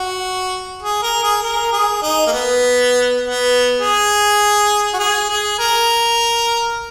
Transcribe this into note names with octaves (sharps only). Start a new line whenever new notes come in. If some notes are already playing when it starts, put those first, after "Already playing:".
Already playing: F#4
G#4
A#4
G#4
A#4
G#4
D#4
A#3
B3
B3
G#4
F#4
G#4
G#4
A#4